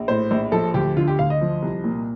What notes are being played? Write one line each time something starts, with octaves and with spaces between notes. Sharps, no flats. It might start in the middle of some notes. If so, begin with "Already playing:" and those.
Already playing: A#1
A2 C5
A#1
F3 A4
D2 G4
D3 F4
G4
D2 F5
D#5
F3
C2
A#2